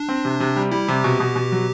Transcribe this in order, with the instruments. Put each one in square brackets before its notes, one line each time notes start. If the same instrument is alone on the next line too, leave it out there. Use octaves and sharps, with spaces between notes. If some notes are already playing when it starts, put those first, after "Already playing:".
Already playing: [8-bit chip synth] D4
[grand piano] C4
C3
C3
G3
[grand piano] G3 [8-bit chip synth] E4
[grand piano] C3 [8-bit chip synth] G4
[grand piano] B2
B2
B2
F#3